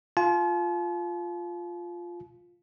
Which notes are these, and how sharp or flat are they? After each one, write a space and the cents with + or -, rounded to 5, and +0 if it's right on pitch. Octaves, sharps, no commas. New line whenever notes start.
F4 +0 A5 -45